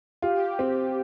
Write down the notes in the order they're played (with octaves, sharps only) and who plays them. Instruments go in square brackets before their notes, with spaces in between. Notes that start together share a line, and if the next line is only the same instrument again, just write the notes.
[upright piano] F4 [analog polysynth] G4
[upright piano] C4